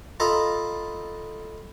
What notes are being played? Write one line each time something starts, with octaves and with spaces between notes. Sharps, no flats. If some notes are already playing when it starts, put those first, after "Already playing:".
F4 A4 D#5 A#5 B5